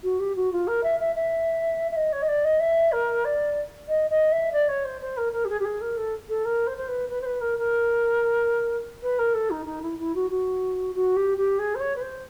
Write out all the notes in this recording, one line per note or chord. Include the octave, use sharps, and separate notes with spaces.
F#4
G4
F#4
F4
A#4
E5
E5
E5
E5
D#5
C#5
D#5
D5
D#5
E5
A#4
D5
D#5
D#5
E5
D5
C#5
C5
C5
A#4
A#4
G4
G#4
G4
G#4
A#4
A4
A4
A#4
C5
C5
B4
B4
C5
B4
A#4
A#4
B4
A#4
A4
D#4
D#4
E4
E4
F#4
F#4
F#4
G4
G4
G#4
C5
C#5
B4
C5